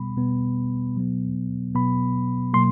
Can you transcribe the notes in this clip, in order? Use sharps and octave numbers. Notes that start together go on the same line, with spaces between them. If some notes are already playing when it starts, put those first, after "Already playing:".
Already playing: B2 G3 B3 B5
B2 G3 B3
B2 F#3 B3
B2 F#3 B3 B5
B2 F#3 A#3 C6